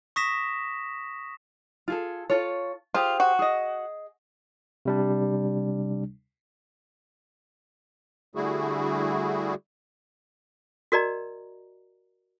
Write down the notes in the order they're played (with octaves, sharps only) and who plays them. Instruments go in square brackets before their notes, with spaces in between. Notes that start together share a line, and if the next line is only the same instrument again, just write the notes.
[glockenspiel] C#6 D#6 A#6 B6 E7
[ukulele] F4 G#4 A4
F4 A4 C#5
[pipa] F4 [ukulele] G4 G#4 C5
[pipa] F#4
[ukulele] G#4 D#5
[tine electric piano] C3 G3 D4
[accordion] D3 G3 A3 E4 F#4 G#4
[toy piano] F#4 A#4 D5 D#5 A#5